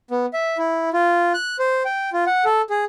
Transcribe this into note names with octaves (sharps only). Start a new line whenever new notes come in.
B3
E5
E4
F4
F#6
C5
G5
F4
F#5
A4
G#4